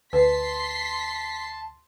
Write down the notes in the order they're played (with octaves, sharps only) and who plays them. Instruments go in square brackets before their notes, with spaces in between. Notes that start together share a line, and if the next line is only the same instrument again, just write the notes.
[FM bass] D2 [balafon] B4 [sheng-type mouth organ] A5 [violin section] C6 B6 C7